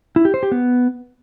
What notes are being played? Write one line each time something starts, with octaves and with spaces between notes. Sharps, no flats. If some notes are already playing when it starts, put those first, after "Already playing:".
E4
G4
C5
G4
B3